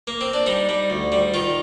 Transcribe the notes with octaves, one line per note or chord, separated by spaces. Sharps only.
A#3
C4
D4
G3 D#4
G3
D2
G3
D#3 F4